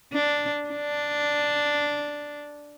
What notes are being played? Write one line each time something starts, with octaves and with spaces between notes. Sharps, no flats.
D4
D4